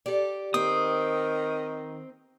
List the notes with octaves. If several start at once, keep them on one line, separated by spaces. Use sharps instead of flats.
G4 A4 D5
D#3 C4 D#6